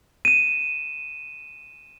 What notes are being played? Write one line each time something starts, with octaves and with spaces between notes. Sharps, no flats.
D#7 E7